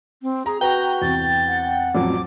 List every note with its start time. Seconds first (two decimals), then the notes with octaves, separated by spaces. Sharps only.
0.23 C4
0.46 G#4 A#5
0.61 F#4 B4 G5 A#5
1.02 E2 C3 A6
1.47 F#5
1.95 A1 F2 F#3 D6